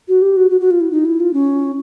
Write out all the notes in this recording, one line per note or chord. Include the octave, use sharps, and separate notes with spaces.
F#4
G4
F#4
F#4
F#4
F4
E4
D#4
E4
F4
C#4